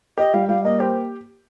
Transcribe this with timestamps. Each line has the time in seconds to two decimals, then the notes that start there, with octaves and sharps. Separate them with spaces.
0.18 G4 D#5
0.34 G3 F5
0.48 G3 F5
0.64 A#3 D#5
0.80 G4 C5